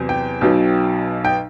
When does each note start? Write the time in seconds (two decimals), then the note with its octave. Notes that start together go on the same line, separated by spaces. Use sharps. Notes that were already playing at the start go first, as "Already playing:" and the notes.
Already playing: E2 C3 F#3
0.09 G5
0.41 B1 B2 F#3
1.25 G5